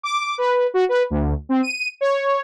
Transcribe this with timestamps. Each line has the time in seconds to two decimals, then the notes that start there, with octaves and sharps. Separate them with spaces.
0.03 D6
0.38 B4
0.74 F#4
0.89 B4
1.10 D2
1.49 C4
1.63 D#7
2.01 C#5